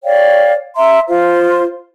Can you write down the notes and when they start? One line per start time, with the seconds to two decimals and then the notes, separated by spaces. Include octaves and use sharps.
0.04 C#5 D5 F5 G5
0.76 E5 A#5 C6
1.09 F4 C5 F5